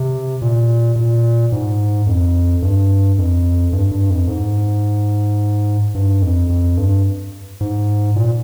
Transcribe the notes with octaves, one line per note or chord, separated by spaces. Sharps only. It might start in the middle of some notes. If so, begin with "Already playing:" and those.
Already playing: C3
A#2
A#2
G#2
F2
G2
F2
G2
G2
F2
G#2
G2
F2
F2
G2
G#2
A#2